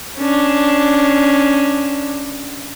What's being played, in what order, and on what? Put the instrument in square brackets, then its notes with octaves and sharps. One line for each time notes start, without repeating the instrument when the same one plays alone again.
[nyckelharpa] C#4 D4